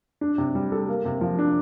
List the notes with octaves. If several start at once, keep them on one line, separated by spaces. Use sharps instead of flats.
D4
C3
G3
A4
A#3
C3
F3
D4